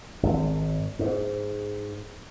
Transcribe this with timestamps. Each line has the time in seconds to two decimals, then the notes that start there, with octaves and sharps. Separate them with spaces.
0.23 G#1
0.99 G#2